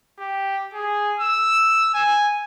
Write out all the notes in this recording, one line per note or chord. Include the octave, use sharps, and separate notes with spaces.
G4
G#4
E6
G#5